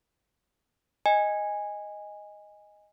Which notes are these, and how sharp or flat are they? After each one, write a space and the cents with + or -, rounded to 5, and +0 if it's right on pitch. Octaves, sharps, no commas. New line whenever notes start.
D#5 +0 G#5 -15